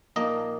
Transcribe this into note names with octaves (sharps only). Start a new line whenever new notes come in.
A#1 A#2 A#3 D#4 D#5